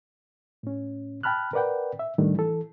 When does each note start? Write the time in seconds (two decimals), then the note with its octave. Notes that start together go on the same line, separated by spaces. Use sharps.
0.63 A2 C#4
1.23 G5 A5 B5 F6 F#6
1.53 A#4 B4 D5 F#5 G5
1.99 E5
2.18 A2 D#3 G3 A3 D4
2.35 E3 A4